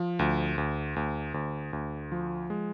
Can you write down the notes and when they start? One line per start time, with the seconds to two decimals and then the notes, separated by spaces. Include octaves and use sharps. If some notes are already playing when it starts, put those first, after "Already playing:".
Already playing: F3
0.19 D2
0.58 D2
0.96 D2
1.34 D2
1.73 D2
2.12 F3
2.50 G#3